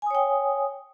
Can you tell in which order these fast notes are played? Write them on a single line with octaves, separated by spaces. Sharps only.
G#5 D#6 C#5 G5